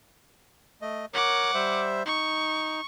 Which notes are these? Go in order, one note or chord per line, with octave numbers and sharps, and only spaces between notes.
A3 D#5
A#4 C#5 F#5 D6
G3 C5 E5
D#4 C#6